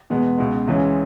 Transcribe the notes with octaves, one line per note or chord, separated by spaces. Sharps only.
E2 B2 G#3 B3
C#2 B2 G#3
C#2 C#3 E3 G#3 C#4